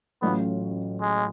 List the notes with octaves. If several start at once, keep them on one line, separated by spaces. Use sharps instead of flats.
A1 A2 F#3 B3 C#4 F4
G#3